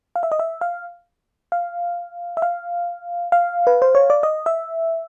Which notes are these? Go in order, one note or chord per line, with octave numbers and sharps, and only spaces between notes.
F5
E5
D#5
E5
F5
F5
E5
F5
F5
B4
C5
C#5
D5
D#5
E5